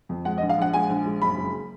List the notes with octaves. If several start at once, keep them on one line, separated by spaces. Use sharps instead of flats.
F2
G#3 F#5
D#5
A#1
F5
A#1 F#5
G#3 G#5
A#1
G#3
F#1 B5
F#1